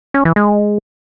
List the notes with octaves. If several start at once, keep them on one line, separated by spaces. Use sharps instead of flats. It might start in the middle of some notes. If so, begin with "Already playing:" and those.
C#4
E3
G#3